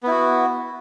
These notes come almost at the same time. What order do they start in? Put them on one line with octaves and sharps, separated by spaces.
B3 E4 F#4